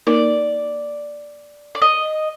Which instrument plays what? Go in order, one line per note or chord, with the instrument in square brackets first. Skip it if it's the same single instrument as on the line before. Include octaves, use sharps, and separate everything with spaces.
[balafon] A#3 D#4 A#4 [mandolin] D5
[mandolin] D5
D#5